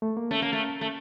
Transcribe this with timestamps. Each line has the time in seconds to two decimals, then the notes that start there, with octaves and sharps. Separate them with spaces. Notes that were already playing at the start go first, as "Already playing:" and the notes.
0.02 A3
0.17 A#3
0.31 A3 C#4
0.42 A#3
0.53 A3
0.81 A3